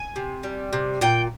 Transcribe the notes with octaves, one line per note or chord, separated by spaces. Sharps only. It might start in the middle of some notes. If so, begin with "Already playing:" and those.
Already playing: G#5
C3
G3
C3
A#2 G5